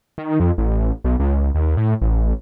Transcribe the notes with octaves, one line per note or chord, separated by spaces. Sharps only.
D#3
F2
A1
B1
C#2
D#2
A2
A1